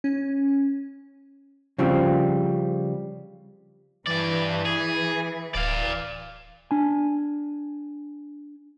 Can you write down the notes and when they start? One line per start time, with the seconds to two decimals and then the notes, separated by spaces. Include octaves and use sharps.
0.04 C#4
1.78 C#3 F3 G3 C4
4.07 G2 E3 D5
4.65 G#4
5.54 D1 D5 F5
6.71 D4 G#5